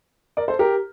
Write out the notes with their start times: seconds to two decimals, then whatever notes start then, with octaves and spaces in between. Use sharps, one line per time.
0.37 A#4 D5
0.48 A4 C5
0.59 G4 A#4